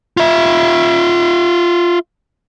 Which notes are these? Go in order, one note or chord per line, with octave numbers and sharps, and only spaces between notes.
F4 E5